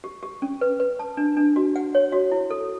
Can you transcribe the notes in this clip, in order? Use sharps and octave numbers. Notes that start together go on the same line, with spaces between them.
G4
G4
C#4
B4
B4
A5
D4
D4
F#4
F#5
C#5
F#4
E4
A4